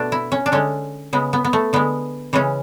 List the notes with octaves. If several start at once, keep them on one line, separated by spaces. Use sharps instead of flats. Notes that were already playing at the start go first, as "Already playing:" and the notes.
Already playing: B2 A3 D4
E4
C#4
D4
D3 G#3 C#4
C#3 G#3 B3
B3
B3
A3
D3 G#3 B3
C#3 E3 G#3 C#4